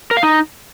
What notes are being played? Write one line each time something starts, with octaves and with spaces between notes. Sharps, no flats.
A#4
F5
D#4